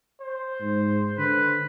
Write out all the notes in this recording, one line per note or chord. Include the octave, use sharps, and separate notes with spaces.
C5
G#2
D3 B4